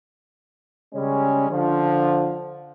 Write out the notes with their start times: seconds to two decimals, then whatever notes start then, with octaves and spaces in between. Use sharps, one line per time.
0.93 C#3 G3 G#3 C#4
1.50 D3 F3